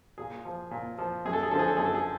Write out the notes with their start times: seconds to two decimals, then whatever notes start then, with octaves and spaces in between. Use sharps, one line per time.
0.18 A#2 G#4
0.45 F3
0.71 A#2
0.98 F3
1.25 F#2 G#4
1.33 A4
1.43 G#4
1.51 D3 F3 A4
1.59 G#4
1.68 A4
1.77 F#2 G#4
1.86 A4
1.95 G#4